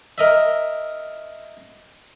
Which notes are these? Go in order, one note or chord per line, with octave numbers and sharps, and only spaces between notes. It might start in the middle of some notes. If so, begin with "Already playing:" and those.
A#4 D#5 E5